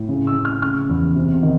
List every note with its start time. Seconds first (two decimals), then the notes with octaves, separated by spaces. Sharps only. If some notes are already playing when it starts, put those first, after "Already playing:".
Already playing: A2
0.09 C#3
0.27 E6
0.36 C#3
0.45 F6
0.62 C#3 F6
0.89 E2
1.16 C3
1.43 D#3